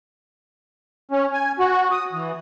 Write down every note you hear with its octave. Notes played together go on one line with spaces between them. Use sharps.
C#4
G#5
F#4
D#6
E3